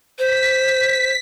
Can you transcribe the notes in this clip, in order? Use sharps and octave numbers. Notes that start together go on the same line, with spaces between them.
C5 B6